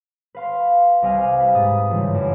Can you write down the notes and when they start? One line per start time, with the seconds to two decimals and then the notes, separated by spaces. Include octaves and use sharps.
0.35 B4 F5 C6
1.02 C2 G4 D#5 F5 G#5 F6
1.40 B4
1.55 G#2 D#6 A6
1.90 G2 C#3 E3 G3 F4
2.14 F#2